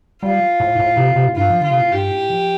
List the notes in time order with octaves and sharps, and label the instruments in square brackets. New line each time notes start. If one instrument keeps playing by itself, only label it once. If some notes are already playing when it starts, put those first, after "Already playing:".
[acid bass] G3 [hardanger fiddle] F4
[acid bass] A2
A2
C3
C3
A2
[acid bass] G2 [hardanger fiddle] F4
[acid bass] F3
[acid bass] D3 [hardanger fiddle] F4
[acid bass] C3
A2
[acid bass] G2 [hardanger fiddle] G4
[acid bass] A2
F3